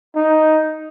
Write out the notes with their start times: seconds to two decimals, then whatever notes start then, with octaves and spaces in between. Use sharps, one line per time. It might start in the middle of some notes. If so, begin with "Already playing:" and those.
0.15 D#4